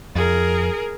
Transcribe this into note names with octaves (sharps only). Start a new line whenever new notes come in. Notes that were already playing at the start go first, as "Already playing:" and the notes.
F2 G#4 A#4